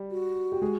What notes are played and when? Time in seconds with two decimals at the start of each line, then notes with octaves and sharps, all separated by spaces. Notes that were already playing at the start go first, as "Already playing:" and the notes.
Already playing: G3 G4
0.11 F#4
0.52 G4
0.62 G#3 G#4